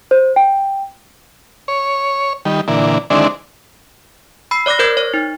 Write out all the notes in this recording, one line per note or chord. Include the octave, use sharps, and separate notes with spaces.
C5
G5
C#5
D#3 G3
A#2 D3 E3
D3 D#3 G#3 C4 D4 E4
B5 E6 C7
C#5 D5 D6 F#6 A#6
A#4 C5 G6 G#6
C#5
D#4